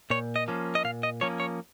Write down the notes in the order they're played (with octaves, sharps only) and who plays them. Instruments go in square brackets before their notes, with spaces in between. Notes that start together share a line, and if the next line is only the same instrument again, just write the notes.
[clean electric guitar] A#2 C#5
D#5
F3 A#3 C#4
D#5
A#2 F5
D#5
F3 A#3 C#4 C#5
C#5